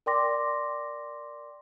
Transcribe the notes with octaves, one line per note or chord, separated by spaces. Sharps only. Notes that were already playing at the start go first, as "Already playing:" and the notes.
A#4 D5 G5 C6 D6 A#6